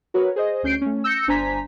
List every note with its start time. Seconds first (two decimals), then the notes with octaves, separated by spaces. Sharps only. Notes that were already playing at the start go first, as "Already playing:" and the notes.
0.14 F#4 A#4 B4 C#5
0.36 G#4 C5 D#5
0.63 D2 C#4 G6 C7 D7
0.81 A3 C#4
1.04 E6 G6 A#6 C#7
1.27 G1 D4 C5 G#5 A#5 B6